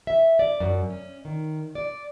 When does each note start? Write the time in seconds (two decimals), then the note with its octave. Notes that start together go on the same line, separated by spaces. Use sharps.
0.07 E5
0.39 D5
0.60 F#2
0.90 C#4
1.25 D#3
1.75 D5